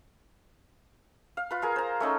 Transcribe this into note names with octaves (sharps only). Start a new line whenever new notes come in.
F5
F4 B4
G#4 A#4 F5
C5 A#5
A3 C#4 D#4 A4